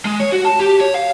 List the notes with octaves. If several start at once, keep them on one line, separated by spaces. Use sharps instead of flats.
G#3
C#5
F#4
A5
G4
C#5
F5